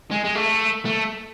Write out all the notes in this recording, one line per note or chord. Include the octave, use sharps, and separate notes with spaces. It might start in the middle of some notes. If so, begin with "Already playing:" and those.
G#3
G#3
A3
A3